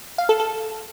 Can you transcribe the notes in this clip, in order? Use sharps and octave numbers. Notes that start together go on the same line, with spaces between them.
F5
A4
A4